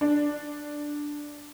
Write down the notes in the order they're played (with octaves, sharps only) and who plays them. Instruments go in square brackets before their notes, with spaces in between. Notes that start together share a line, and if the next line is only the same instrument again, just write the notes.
[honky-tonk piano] D4